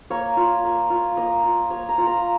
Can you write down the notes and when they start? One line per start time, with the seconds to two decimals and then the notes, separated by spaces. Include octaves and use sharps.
0.10 A#3 C#5
0.37 F4
0.64 A#3
0.90 F4
1.17 A#3 D#5
1.44 F4
1.70 A#3 C#5
1.89 A#5
1.98 F4
2.06 A#5